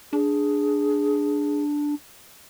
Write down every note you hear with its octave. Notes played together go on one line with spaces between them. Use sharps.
D4 G#4